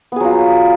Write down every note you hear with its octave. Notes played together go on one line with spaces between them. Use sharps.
F#3 B3 F4 G#4